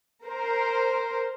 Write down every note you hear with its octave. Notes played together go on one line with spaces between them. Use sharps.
A#4 C5